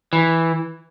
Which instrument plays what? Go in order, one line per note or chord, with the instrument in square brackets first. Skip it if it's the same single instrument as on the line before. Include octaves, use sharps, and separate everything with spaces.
[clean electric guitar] E3